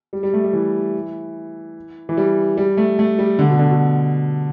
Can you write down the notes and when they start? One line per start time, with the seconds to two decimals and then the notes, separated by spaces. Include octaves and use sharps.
0.13 G3
0.23 G3
0.34 A3
0.44 G3
0.53 E3
2.09 E3
2.17 G3
2.57 G3
2.77 A3
2.99 A3
3.19 G3
3.39 D3
3.49 B2
3.59 D3
3.69 B2